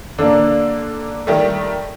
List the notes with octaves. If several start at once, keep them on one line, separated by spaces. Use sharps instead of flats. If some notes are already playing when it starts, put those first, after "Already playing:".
D3 A#3 D4
D#3 G3 A3